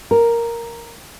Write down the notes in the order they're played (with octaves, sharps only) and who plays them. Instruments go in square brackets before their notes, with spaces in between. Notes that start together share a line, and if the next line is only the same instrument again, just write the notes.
[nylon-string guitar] A#4